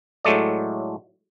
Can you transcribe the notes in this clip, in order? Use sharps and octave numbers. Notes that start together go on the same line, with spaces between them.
A2 F#3 G#3 A3 D5